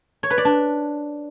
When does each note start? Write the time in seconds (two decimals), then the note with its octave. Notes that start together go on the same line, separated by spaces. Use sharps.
0.23 C#5
0.30 B4
0.38 D5
0.45 D4